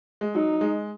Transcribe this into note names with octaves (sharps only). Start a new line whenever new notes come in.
G#3
F#3 D#4
G#3